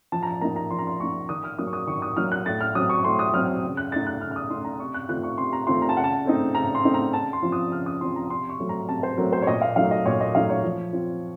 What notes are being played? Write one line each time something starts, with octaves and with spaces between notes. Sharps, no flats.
F3 A5
A#5
A5
A#3 D#4 A#5
A#5
F3 C6
A#5
C6
A#3 D#4 C#6
D#3 D#6
F6
F#3 A#3 D#4 D#6
C#6
D#6
D#3 C#6
D#6
F#3 A#3 D#4 F6
F#6
A2 A6
F6
F#3 C4 D#6
C#6
A2 C6
D#6
F#3 C4 F6
C#3
F#6
A3 D#4 A6
F#6
C#3 F6
F6
D#6
A3 D#4 C6
A#5
C3 C#6
F#6
D#3 A3 C4 F4 F#6
C#6
C3 C6
A#5
D#3 A3 C4 F4 C6
A#5
A5
C#3 F#5
A5
A3 C4 D#4
C#3 A#5
C6
A3 C4 D#4
A#5
C#3 A5
C6
F3 C4 F4
D#6
C#3 F6
D#6
F3 C4 F4 C6
A#5
C3 C6
C#6
F#3 A3 C4
A#5
C3 A5
C5
F#3 A3 C4 A#4
C5
C#5
A#2 D#5
F5
F#3 A3 D#4 F5
D#5
A#2 C#5
D#5
F#3 A3 D#4 F5
C#5
F3
C4 F4